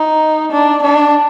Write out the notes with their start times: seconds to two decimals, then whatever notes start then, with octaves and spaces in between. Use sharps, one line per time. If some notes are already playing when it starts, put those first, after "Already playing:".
Already playing: D#4
0.52 D4
0.82 D4